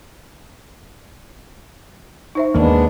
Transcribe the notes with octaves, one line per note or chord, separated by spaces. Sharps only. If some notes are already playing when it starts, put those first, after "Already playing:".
D#4 C5 E5
D#2 G#3 A#3 B3 D4